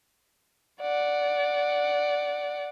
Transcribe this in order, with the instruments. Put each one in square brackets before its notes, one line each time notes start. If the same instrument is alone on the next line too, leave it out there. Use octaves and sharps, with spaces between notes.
[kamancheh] D5 F#5